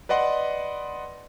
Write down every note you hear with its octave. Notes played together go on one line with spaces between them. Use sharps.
B4 D5 D#5 F#5 C6